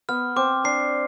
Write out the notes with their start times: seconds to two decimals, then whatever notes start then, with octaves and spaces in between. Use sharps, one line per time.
0.09 B3 F6
0.36 C4 D6
0.64 D4 C7